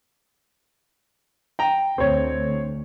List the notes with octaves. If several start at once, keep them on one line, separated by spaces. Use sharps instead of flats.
G5 A#5
D2 C4 C#5